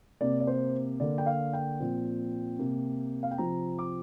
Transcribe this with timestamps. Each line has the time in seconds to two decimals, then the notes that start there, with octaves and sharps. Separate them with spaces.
0.21 C3 A#3 D5
0.40 D5
0.47 C5
1.00 D3 A#3 D5
1.18 G5
1.26 F5
1.53 G5
1.80 A#2 F3 C4
2.59 C3 A#3
3.23 F5
3.31 G5
3.38 C3 F3 C4 A#5
3.79 D6